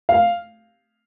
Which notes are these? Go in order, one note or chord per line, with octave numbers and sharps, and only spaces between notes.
F5